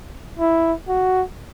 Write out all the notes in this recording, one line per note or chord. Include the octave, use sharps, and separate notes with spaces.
E4
F#4